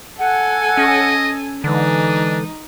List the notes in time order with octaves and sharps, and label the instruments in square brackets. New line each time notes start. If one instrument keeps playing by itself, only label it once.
[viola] A4 G#5 [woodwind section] F#5
[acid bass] C#4 [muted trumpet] D#5
[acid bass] D3 [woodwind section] E3 G#3 [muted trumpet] D4 [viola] D#4